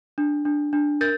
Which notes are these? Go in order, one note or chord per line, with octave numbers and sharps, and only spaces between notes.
D4
D4
D4
A#4 G6 A6